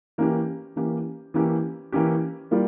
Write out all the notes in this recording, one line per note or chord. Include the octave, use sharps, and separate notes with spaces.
E3 A#3 C#4 G4
E3 A#3 C#4 G4
E3 A#3 C#4 G4
E3 A#3 C#4 G4
G3 A#3 F4 A#4